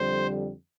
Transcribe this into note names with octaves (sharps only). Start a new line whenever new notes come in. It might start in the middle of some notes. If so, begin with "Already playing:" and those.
Already playing: F2 D3 G3 C5